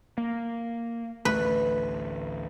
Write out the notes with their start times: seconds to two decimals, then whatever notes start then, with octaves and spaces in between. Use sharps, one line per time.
0.18 A#3
1.25 A1 D2 A3 B4